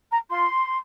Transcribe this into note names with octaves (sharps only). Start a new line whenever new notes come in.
A#5
F4 C6